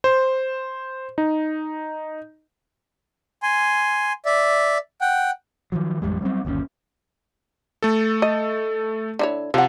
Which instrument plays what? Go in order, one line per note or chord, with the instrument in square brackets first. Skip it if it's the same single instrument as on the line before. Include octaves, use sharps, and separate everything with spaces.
[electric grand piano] C5
D#4
[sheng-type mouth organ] G#5 C6
D5 E5
F#5 G5
[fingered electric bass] D#3 F3 F#3
A1 F2 G3 G#3
F#3 G3 B3 C4
G1 D#2 A#2 C#4
[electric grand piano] A3 A4
[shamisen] D#5
D3 E4 C#5
[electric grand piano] C3 [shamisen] F3 F#5